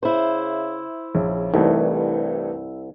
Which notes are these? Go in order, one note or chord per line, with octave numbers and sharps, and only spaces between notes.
C#3 E4 C5
A#1 C#3
C2 G2 E3 A3 D#4